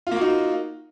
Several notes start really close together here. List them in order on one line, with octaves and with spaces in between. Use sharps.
F4 A#3 F#4 D#4